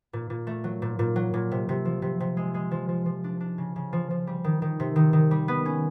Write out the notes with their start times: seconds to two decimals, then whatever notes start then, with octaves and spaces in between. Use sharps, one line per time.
0.13 A#2
0.30 A#2
0.47 A3
0.64 F#3
0.82 A#2
0.99 A#2
1.16 F#3
1.34 A#2
1.51 C3
1.69 C3
1.85 F3
2.02 C3
2.20 C3
2.37 G#3
2.54 G#3
2.71 F3
2.89 F3
3.06 F3
3.24 D4
3.40 D4
3.58 C#3
3.76 C#3
3.93 F3
4.11 F3
4.27 G3
4.44 D#3
4.62 D#3
4.80 C3
4.96 D#3
5.13 D#3
5.31 G3
5.48 B3
5.66 C#4